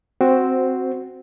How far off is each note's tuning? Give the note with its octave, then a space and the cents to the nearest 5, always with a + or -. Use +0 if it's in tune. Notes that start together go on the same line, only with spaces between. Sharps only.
C4 +0 F#4 +0 C5 -10